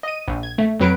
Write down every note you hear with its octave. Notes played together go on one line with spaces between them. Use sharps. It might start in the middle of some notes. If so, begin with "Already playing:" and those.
D#5 D#7
A#1
G#6
A3
F2 F#3 B4 D7